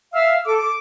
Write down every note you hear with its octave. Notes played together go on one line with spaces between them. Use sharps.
E5 F5 E6 F6
A4 D6
D6